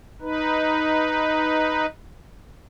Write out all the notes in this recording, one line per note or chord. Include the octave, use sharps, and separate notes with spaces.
D#4 B4